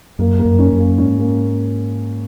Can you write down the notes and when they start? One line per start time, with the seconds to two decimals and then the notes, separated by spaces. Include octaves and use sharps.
0.19 F#2 A#3
0.39 A#3
0.45 F#2
0.59 C#4
0.73 F#2
0.78 A#3
0.98 G#2 C#4
1.19 A#3